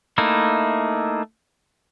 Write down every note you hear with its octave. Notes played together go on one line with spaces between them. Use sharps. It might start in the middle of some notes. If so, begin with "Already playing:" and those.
A3 A#3 D#4 E4